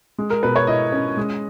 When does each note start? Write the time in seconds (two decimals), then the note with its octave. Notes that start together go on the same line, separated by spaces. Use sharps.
0.18 G#3
0.30 A#4
0.43 B2 B4
0.56 C#5
0.67 E4 D#5
0.92 C#4
1.17 G#3